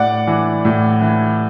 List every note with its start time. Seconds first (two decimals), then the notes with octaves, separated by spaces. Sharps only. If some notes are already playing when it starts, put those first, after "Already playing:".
Already playing: A2 D5 F#5
0.27 E3
0.65 A2
1.01 E3